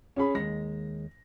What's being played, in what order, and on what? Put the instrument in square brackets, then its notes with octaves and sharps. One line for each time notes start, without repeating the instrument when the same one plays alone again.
[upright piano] C#4 G#4 B5
[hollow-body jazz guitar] D#2 G#3 [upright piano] A#6